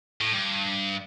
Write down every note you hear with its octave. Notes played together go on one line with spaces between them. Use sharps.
A2
G2